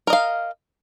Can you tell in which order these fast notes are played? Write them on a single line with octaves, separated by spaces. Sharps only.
A#4 D#5 F5